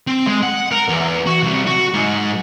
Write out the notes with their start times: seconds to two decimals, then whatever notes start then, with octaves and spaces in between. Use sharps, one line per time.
0.07 C4
0.27 G#3
0.43 F#5
0.72 A#4
0.89 E2
1.26 F#4
1.43 C2
1.67 F#4
1.94 G#2